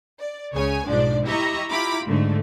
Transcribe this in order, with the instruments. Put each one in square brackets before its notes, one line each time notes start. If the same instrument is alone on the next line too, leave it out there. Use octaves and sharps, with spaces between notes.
[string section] D5
C#2 C#3 C#5 G#5
B1 G#2 F3 D4 D5
E4 G4 D#5 E5 A#5 C#6
E4 F4 G4 A#5 B5 D6
G#2 D3 A3